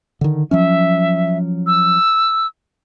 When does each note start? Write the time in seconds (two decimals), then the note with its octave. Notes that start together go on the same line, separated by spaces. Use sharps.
0.21 D3 D#3
0.51 F3 F#3 C#4 E5
1.67 E6